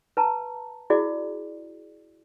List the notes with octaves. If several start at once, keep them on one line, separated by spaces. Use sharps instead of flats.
B4 A5 A#5
E4 F#4 G#4 D5